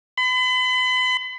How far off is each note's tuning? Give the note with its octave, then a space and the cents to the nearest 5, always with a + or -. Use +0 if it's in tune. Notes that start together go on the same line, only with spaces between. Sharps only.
B5 +40